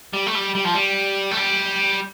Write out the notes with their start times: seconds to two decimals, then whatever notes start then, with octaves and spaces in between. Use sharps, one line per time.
0.13 G3
0.26 A3
0.35 G3
0.55 G3
0.65 F3
0.74 G3
1.31 A3
1.37 G3